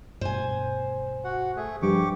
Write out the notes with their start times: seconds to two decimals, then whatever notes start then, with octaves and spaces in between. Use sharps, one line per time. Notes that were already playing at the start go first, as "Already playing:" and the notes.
0.21 G2 B2 C5 G#5
1.24 F#4 F#5
1.57 A3 G#4
1.82 G2 F3 G4 C#6 D6